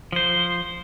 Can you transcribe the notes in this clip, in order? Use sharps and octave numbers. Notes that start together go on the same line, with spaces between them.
F3 C5